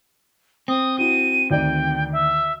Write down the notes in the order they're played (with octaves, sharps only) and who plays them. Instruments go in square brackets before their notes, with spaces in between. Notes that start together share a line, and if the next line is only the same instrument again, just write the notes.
[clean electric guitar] C4 [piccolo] D#6
[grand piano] E4 F#4 [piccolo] D#7
[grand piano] D2 D#3 D5 [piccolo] G5
[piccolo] E5